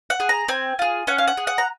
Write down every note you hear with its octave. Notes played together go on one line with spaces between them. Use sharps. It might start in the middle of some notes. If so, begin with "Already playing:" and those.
F#5
G#4
A#5
C4 G#5
F4 G#4
C#4 F#5
F5
F#5
G#4
F#5
A#5